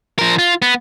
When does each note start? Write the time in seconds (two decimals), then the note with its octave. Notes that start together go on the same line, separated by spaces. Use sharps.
0.19 F3 A#4
0.39 F4
0.62 B3